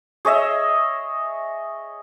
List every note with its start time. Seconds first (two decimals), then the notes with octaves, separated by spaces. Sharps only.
0.25 G#4 C#5 D#5 E5